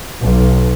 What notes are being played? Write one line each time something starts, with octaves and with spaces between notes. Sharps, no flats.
B1